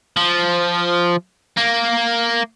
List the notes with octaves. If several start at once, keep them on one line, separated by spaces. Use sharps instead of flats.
F3
A#3